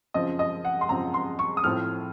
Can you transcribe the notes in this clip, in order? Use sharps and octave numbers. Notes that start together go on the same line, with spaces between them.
F#2 C#3 F3 C4 D#5
D#5
F#5
C6
F#2 C#3 F3 C4 A#5
C6
C#6
D#6
A2 F3 A3 C4 F6